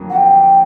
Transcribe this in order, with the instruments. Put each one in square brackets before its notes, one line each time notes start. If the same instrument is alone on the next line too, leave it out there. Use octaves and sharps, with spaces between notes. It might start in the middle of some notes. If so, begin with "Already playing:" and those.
Already playing: [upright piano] F2 D3 F#3 A#3
[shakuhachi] F#5
G5